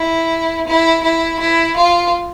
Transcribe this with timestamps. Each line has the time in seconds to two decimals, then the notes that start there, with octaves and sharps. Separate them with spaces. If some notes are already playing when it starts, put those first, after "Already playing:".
Already playing: E4
0.67 E4
1.03 E4
1.40 E4
1.76 F4